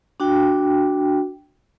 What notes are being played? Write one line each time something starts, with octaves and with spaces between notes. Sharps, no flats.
D4 F#4 G5